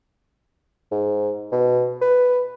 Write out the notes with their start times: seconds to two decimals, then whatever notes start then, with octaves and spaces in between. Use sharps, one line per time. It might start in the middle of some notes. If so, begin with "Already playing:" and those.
0.91 G#2
1.52 B2
2.01 B4